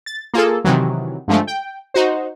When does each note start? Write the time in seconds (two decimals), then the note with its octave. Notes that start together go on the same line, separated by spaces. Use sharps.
0.06 A6
0.34 A#3 F4 G#4 A4
0.65 C3 D#3 E3 F#3
1.28 G2 D3 F3 G#3 A3
1.47 G5
1.94 D#4 F#4 C5